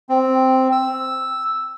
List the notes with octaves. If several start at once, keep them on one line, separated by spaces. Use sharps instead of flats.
C4
E6